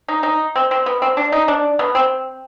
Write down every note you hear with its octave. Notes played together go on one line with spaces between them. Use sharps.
D#4
D#4
C4
C4
B3
C4
D4
D#4
D4
B3
C4